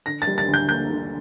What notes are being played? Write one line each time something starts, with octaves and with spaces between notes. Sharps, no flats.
D3 A#6
A6
G3
A6
D2
G6
A#3 G6
D3